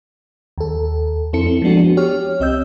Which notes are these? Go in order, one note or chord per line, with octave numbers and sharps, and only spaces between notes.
D#2 A4
F2 C4 E4 A4 C#7
C4
F3 G#3 B3 D4 F#4
G4 C#5 F6
C2 C4 D#5 E6 G6